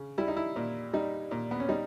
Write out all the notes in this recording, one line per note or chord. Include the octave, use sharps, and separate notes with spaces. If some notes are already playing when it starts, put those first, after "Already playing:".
Already playing: C#3
G3 E4
D#4
E4
A#2
G3 D#4
A#2
B3
C#4
G3 D#4